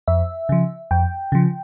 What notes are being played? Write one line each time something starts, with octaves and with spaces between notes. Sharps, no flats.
F2 E5
C#3 F3
F2 G5
C#3 F3